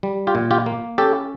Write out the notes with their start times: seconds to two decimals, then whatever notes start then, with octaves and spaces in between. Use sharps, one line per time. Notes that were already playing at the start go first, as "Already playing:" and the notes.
0.03 G3
0.27 F4 G4
0.35 A#2
0.51 F4 G4
0.66 A#3
0.98 C#4 G4 A4